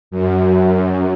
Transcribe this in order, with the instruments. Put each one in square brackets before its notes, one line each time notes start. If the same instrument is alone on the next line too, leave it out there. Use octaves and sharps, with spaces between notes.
[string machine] F#2